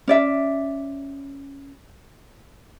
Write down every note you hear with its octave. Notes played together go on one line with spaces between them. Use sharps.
C#4 D5 E5